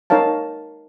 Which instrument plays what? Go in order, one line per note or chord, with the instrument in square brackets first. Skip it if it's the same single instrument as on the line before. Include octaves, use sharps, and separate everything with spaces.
[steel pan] D#4 A#4 C#5 F5 A5